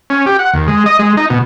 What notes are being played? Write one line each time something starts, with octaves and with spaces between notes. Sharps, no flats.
C#4
G4
F#5
D#2
G#3
D#5
G#3
D#4
B2